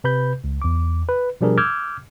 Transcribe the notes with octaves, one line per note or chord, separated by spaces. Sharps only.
C3 B4 B5 G6
C#2
E2 D6
B4
B2 F3 G3 D4 G#4 A#4
D6 E6 F6 G6 G#6